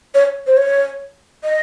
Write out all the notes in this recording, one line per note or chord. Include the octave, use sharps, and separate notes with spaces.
C#5
C5
C#5
D#5